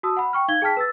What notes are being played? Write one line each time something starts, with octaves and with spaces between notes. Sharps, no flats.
F#4 A5 D#6 E6
F#5 B5
G5 C#6 F6
D#4 F5 G#6 G7
G#4 G5 A5 F6 B6
B4 E6 A6